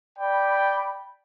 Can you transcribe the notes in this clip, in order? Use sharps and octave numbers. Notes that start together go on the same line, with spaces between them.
D5 G5 B5